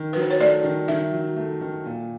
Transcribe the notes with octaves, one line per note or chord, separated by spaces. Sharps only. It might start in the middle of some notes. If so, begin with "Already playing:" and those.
Already playing: D#3
F#3 B4
C5
C#5
A3 D5
D#3
D#3 E5
F#3
A3
D#3
A#2